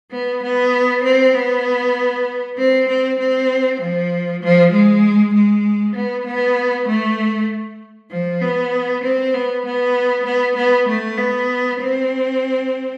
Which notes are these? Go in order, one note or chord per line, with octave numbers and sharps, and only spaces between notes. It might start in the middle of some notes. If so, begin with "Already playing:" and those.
B3
B3
C4
B3
C4
C4
C4
F3
F3
G#3
G#3
B3
B3
A3
F3
B3
C4
B3
B3
B3
B3
A3
B3
C4